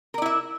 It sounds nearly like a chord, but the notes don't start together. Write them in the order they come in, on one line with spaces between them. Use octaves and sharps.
A#4 D5 E4 E5